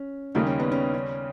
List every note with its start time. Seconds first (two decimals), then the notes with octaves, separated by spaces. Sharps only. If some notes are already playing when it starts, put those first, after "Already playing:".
Already playing: C#4
0.35 D#2 C#3 G3 A#3 D#4
0.46 C#4
0.60 B3
0.72 C#4
0.93 C#4